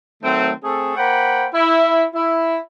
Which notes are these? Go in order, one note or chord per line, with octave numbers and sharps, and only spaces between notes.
D#3 F#3 A3 C4
A3 C4 G#4 A4
A#3 C5 F#5 G5 B5
E4
E4